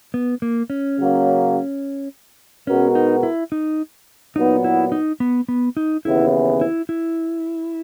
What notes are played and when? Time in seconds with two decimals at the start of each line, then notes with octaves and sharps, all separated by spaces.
0.14 B3
0.42 A#3
0.70 C#4
0.98 C#3 F#3 A#3
2.67 B2 G#3 B3 C#4 F#4 A#4
2.95 D#4
3.23 E4
3.52 D#4
4.36 A#2 F#3 B3 D#4
4.64 E4
4.92 D#4
5.20 B3
5.49 B3
5.77 D#4
6.05 D#2 C#3 E3 B3 E4
6.61 E4
6.89 E4